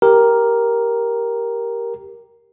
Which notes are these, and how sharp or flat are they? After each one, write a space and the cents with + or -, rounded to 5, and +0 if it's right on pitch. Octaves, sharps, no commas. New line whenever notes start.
G4 +0 A#4 +5